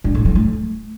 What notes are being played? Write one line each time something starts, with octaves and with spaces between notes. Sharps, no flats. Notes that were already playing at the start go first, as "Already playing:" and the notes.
G2
A2
F#3
A3